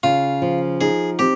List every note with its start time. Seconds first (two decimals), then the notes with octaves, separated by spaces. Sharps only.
0.03 C#3 F4
0.42 F3
0.81 D#4 G#4
1.19 C4 G4